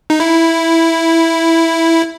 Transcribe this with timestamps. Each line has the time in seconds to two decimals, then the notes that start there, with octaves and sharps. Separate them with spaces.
0.10 D#4
0.20 E4